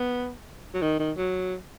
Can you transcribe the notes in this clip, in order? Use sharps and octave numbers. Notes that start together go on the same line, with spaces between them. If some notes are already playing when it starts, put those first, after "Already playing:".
Already playing: B3
F#3
D#3
D#3
F#3